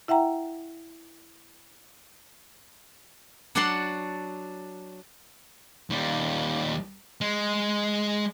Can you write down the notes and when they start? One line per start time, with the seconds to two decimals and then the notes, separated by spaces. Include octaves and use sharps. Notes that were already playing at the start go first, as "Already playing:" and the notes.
0.08 E4 E5 F#5 G5 A#5
3.55 F#3 D4 D5 F#5 A5 C6
5.90 D#2 G3
7.21 G#3